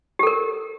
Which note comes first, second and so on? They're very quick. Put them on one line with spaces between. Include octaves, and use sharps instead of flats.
G4 A4 A#4